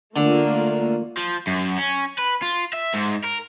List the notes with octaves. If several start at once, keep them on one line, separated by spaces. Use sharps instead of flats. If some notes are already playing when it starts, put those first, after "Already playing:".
D3 A3 A#3 F4
F3
F#2
C#4
B4
F4
E5
G#2
A#4